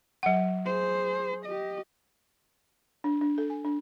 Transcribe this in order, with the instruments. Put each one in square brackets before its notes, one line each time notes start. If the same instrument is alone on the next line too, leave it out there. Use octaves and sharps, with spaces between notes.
[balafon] F#3 F#5
[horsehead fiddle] G#4 C5
G4 D#5
[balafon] D4
D4
A4
G#5
D4